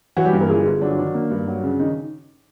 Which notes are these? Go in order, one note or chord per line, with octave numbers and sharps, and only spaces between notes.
E3 F#3 F#4
G3 G4
G2
A#3 A#4
G1 G#3 G#4
G1
F#3 D4
D#3 D4
A#3
G2
F#3
C#3
D#3 D#4